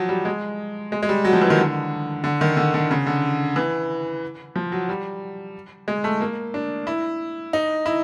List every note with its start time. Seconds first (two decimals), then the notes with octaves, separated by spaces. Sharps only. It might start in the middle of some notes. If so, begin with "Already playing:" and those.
Already playing: F3 F#3
0.09 G3
0.25 G#3
0.92 G#3
1.03 G#3
1.09 G3
1.25 F#3
1.33 F3
1.42 E3
1.50 D#3
1.58 D3
2.24 D3
2.41 D#3
2.57 D3
2.74 D3
2.91 C#3
3.06 D3
3.56 E3
4.56 F3
4.72 F#3
4.89 G3
5.88 G#3
6.04 A3
6.21 A#3
6.54 D4
6.87 E4
7.53 D#4
7.86 E4